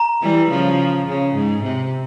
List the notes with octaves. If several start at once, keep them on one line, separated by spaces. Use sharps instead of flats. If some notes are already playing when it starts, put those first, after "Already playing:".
Already playing: A#5
E3 G3
C#3 F3
C#3
G#2
C3